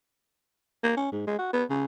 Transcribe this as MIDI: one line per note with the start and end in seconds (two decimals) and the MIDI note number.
0.83 0.95 58
0.97 1.09 61
1.12 1.24 44
1.27 1.36 56
1.39 1.52 66
1.53 1.64 59
1.70 1.85 49